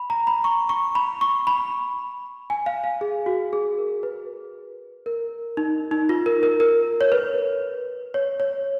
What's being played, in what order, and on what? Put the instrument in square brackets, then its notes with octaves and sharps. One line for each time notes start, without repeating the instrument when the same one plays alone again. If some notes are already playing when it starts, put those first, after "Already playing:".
Already playing: [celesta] B5
A#5
B5
C#6
C#6
B5
C#6
B5
G#5
F5
F5
G#4
F#4
G#4
A#4
B4
A#4
D#4
D#4
F4
A#4
A#4
A#4
C#5
B4
C#5
C#5